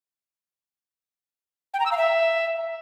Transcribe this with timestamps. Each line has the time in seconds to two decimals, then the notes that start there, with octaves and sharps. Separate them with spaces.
1.74 G5
1.80 A#5
1.86 E6
1.92 F5
1.97 E5